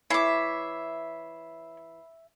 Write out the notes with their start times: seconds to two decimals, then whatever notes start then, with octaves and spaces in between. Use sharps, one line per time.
0.10 E3 C#5 E5 B5 D6 C7